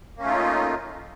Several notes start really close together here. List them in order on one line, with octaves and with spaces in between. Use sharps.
A#3 C#4 A3 F4 D#4